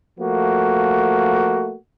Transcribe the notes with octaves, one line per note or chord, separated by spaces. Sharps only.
F3 A3 A#3 F#4